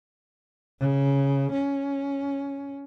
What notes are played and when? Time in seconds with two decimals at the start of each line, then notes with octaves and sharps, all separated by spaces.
0.80 C#3
1.52 C#4